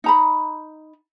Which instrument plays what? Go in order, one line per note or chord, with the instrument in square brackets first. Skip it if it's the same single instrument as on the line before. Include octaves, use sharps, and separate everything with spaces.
[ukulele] D#4 A#5 B5